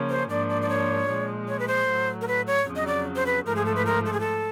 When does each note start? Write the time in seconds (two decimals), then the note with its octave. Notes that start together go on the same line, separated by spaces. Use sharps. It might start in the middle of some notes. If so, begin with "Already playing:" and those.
Already playing: C#3 F3 A#3 C#4
0.10 C5
0.30 G#2 F3 A#3 D4 D5
0.50 D5
0.62 D5
0.69 C#5
1.09 A#2 F3 G#3
1.48 C#5
1.59 B4
1.68 C5
1.88 A2 F#3 A3
2.21 A#4
2.28 B4
2.47 C#5
2.67 F2 C#3 F#3
2.76 D#5
2.87 D5
3.16 C5
3.26 B4
3.46 G#2 F3 A3 A#4
3.56 G#4
3.66 A4
3.76 B4
3.86 A#4
4.06 A4
4.13 G#4
4.20 A4